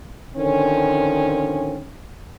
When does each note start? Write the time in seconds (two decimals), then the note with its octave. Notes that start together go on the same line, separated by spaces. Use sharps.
0.36 D3 D#3 F3 C4 C#4